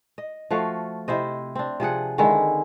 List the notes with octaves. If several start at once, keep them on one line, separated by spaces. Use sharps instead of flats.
D#5
F3 A3 F#4 F5
C3 E4 C5 D#5
C4 D4
C3 F3 G#4 F#5
D3 D#3 G#3 E4